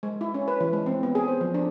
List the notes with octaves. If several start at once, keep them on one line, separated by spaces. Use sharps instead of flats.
G#3
E4
C#4
B4
E3
G#3
C4
B3
G#4
C5
F3
D4